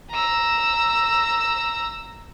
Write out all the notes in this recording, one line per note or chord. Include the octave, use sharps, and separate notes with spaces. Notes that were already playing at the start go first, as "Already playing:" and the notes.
A#5 E6